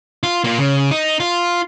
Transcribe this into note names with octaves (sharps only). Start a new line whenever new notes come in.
F4
A#3 F4
C#3
D#4
F4